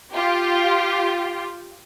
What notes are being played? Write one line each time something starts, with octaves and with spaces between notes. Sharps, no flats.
F4 G4